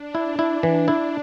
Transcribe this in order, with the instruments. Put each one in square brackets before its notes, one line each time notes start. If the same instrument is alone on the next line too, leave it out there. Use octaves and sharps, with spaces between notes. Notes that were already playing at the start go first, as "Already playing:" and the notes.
Already playing: [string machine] D4
[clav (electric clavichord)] E4
E4
E3
E4